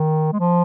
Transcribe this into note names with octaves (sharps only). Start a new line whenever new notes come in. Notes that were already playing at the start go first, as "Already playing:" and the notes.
Already playing: D#3
G#3
F3